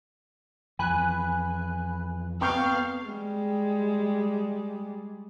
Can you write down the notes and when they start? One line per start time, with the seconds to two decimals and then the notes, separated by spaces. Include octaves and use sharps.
0.79 F2 E3 G#5 B5 F#6
2.41 B3 C4 F5 G5 C#6 G6
3.06 G3 G#3